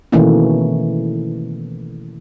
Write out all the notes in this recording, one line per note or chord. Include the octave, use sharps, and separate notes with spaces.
B2 D#3 E3 A3 A#3 C#4